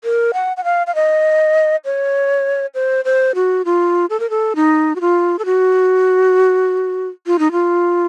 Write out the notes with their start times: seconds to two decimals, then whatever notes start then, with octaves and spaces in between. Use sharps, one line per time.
0.04 A#4
0.34 F#5
0.57 F#5
0.64 F5
0.87 F5
0.95 D#5
1.85 C#5
2.75 C5
3.05 C5
3.35 F#4
3.65 F4
4.10 A4
4.20 A#4
4.30 A4
4.56 D#4
4.96 F#4
5.01 F4
5.39 A4
5.45 F#4
7.27 F4
7.39 D#4
7.52 F4